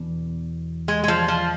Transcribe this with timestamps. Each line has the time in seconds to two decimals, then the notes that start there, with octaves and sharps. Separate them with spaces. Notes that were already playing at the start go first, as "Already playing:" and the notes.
Already playing: E2 B2 D4
0.88 G#3
1.04 G#3
1.08 F3
1.28 F3